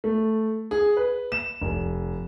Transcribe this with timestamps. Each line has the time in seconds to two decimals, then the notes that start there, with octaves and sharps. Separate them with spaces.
0.04 A3
0.71 G#4
0.97 B4
1.32 E7
1.62 F1